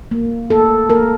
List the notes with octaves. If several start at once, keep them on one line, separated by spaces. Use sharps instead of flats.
A#3
A#3 A4
A#3 A#4